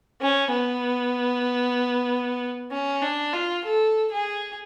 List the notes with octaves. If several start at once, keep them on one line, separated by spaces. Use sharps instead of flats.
C#4
B3
C#4
D4
F4
A4
G#4